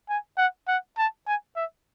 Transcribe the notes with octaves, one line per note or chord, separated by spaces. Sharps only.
G#5
F#5
F#5
A5
G#5
E5